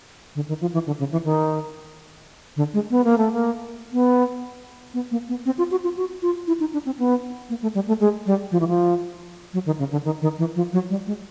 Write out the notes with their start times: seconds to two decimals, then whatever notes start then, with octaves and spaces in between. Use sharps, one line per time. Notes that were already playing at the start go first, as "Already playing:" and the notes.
0.35 D3
0.48 D#3
0.61 F3
0.74 E3
0.86 D3
0.99 C#3
1.12 E3
1.24 D#3
2.56 D3
2.74 G#3
2.90 B3
3.04 A#3
3.18 A3
3.33 A#3
3.92 B3
4.94 B3
5.11 A#3
5.29 B3
5.46 C4
5.58 F4
5.71 F#4
5.84 F4
5.97 F#4
6.22 F4
6.47 E4
6.60 D#4
6.73 D4
6.86 C4
6.99 B3
7.49 A#3
7.62 A3
7.75 G3
7.88 A3
8.00 G#3
8.26 G3
8.51 F3
8.60 E3
8.68 F3
9.53 F#3
9.66 D#3
9.79 C#3
9.92 D3
10.05 D#3
10.22 D#3
10.38 E3
10.56 F3
10.73 F#3
10.89 G3
11.07 G#3